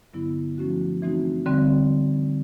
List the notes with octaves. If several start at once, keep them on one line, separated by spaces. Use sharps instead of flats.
G2 D3 F#3 B3 E4
F3 A3 C#4 F#4
E3 A3 C4 D#4 F#4
D3 G3 C4